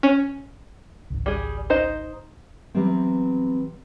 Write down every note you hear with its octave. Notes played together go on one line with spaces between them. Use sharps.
C#4
G#1 C#2
G3 G#4
D#4 C5 D#5
E3 F#3 G3 B3 C4